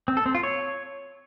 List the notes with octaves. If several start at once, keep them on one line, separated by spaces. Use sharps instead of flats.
C4
A4
C4
F4
C#5